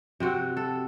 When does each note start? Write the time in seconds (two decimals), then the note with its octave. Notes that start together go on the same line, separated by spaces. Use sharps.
0.20 C3 C4 F#4
0.57 A4